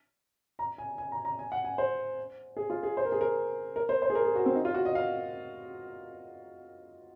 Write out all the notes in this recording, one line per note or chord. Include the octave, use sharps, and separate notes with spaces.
A#5
G#5
G#5
A#5
A#5
G#5
F#5
G#5
C5
G#4
F4
G#4
C5
A#4
G#4
A#4
A#4
C5
C5
G#4
A#4
G#4
F#4
C4
D#4
F4
F#4
D#5
F5